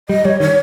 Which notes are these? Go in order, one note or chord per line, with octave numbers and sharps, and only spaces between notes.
G3 D#5
G3 C#5
D#3 C#5